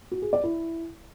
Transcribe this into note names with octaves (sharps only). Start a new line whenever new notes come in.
F#4
G#4
D5
E4